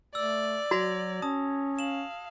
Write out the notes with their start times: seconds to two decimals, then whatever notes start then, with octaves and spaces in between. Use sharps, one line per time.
0.15 A3 D5 E6
0.71 F#3 F#4 G#6 A#6 F7
1.22 C#4 A5 D#6
1.79 F5 E7 F#7